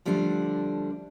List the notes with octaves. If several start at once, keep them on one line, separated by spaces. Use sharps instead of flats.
D3 F3 G3 A3 D4